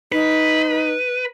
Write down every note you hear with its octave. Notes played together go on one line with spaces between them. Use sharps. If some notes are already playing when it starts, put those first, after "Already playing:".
D#4 B4